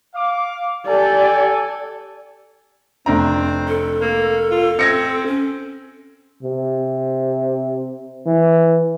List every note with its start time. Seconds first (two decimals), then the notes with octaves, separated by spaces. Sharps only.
0.15 F5 D6
0.87 G4 A4 D5 G#5
3.06 F1 C4 D4 A#5
3.68 A4
4.01 A#3
4.51 F4
4.79 C4 G#6 A#6 C#7
5.26 C#4
6.43 C3
8.26 E3